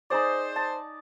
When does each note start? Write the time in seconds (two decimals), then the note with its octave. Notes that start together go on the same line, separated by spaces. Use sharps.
0.10 D#4 G#4 C5 D5
0.56 A5